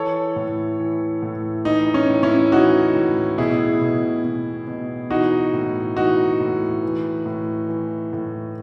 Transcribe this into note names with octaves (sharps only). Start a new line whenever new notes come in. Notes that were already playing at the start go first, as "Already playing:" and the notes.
Already playing: E3 A4 C#5
A2
E3
A2
E3 D#4
C#4
A2
C#4 E4
E3 D#4 F#4
A2
B2 E4 G#4
B2
B2
B2
E3 D#4 F#4
A2
E3 D#4 F#4
A2
E3
A2
E3
A2